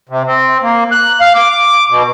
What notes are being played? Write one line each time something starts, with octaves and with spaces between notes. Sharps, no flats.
C3
C4
A#3
F#6
F5
D6
B2